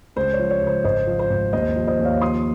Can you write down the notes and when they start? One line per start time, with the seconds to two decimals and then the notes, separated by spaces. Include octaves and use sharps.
0.16 C#2 C5
0.33 C#5
0.39 F3
0.50 C#5
0.62 C#2
0.67 C5
0.84 G#1 C5 D#5
1.07 F3
1.19 C5
1.30 G#1
1.53 D#2 C5 D#5
1.76 F3
1.87 C5 D#5
1.99 D#2
2.04 C#5 F5
2.21 F3 C6 D#6